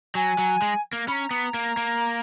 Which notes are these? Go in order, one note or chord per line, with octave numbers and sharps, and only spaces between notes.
F#3 G#5
F#3
G#3
A#3
C#4 A#5 B5
B3
A#3
A#3